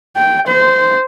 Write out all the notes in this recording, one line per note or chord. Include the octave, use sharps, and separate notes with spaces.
G5
C5